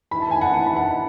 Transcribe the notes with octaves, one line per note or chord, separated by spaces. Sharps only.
E3 B5
A5
G#5
F#5 A5
E3 A5
B5
F#5 A5